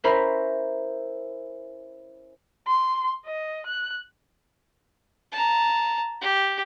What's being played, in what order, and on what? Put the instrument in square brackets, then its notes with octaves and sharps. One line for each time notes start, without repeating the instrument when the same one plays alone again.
[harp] C#4 E4 A#4 C5 A#5 B5
[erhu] C6
D#5
F#6
[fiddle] A5 A#5
G4